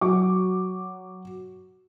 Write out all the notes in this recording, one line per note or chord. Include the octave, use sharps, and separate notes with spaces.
F#3 C#6 D6